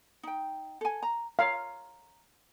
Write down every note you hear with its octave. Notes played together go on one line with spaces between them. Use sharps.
D#4 G5
A4 G#5
A#5
C#5 F5 A#5